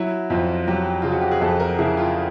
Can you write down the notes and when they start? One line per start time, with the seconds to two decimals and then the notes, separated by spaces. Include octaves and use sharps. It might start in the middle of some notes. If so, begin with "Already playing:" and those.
Already playing: F#3 E4
0.30 F2 F4
0.67 F#3 G4
1.02 C#3 F4
1.12 F#4
1.21 G4
1.31 G#4
1.41 F2 A4
1.60 A#4
1.79 C#3 E4
1.97 F4